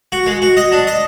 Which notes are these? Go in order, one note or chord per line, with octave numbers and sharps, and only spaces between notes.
F#4
G#3
F#4
D#5
D4
D#5